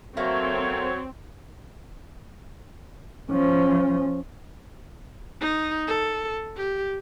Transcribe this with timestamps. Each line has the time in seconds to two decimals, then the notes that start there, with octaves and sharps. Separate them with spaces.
0.17 F#3 A3 A#3 C4 C#5
3.31 F3 C#4
5.41 D#4
5.87 A4
6.57 G4